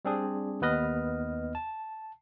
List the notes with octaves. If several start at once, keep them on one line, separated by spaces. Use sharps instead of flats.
G3 C4 D4 G#4
D#2 B3 B4 D#5 F6
A5